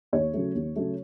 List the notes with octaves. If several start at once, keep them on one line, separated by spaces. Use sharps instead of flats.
D#2 C#5
C#3 F#3 A3
D#2
C#3 F#3 A3